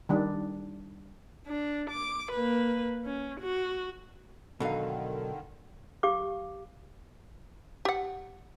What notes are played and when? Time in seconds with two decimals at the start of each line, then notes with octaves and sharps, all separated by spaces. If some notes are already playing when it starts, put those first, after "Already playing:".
0.09 D#3 G3 D4
1.47 D4
1.90 D6
2.32 A#3 B4
3.05 C#4
3.40 F#4
4.60 B2 D3 D#3 F#3 D#4 A4 F5
6.03 G4 F5 D6
7.85 G4 F#5